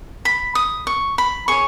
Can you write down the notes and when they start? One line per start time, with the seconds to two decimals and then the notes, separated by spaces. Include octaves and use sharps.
0.25 B5
0.55 D#6
0.87 C#6
1.18 B5
1.48 G#4 C#5 C#6